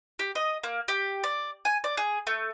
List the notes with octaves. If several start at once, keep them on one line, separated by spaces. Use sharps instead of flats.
G4
D#5
A#3
G4
D5
G#5
D5
G#4
A3